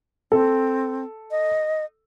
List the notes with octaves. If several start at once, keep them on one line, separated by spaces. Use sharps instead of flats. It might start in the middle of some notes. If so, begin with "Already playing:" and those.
C4 A4
D#5